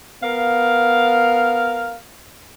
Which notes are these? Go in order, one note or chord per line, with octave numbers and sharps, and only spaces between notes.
B3 A#4 F5